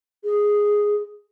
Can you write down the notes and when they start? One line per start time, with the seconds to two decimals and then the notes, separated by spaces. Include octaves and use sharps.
0.24 G#4